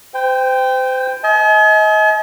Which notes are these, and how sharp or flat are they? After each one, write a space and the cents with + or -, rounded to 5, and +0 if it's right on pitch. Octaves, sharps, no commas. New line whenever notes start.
C5 -30 G5 +10
D#5 +35 G#5 +45